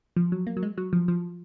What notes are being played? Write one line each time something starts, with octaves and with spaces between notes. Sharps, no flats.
F3
F#3
A#3
F#3
G#3
F#3
F3
F3